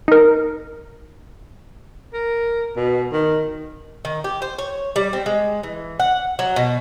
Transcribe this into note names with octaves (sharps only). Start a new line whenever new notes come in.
D#4 A#4
A#4
B2
D#3
D#3
G4
C5
C#5
G3
C4
G#3
E3
F#5
F#3
B2